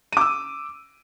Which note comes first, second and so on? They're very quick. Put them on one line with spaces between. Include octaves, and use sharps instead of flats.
D#7 D6 E6